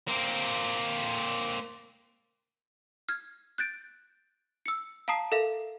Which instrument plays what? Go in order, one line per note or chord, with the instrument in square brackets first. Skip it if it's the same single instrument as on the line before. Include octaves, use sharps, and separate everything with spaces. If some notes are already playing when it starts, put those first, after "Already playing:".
[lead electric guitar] A#3 C4
[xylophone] F6 G#6
F#6 G6 A6 D7
E6 C#7
F5 A5 A#5 D#6 C7
A4 A#4 E5 F5